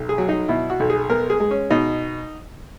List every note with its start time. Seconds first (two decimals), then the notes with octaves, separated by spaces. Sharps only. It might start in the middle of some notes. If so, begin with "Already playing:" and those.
Already playing: B1
0.09 G#4
0.18 F#3
0.29 D#4
0.48 B2 E4
0.70 F#4
0.80 B1
0.90 G#4
1.10 B3 A#4
1.30 G#4
1.40 G#3
1.51 C#4
1.70 B2 D#4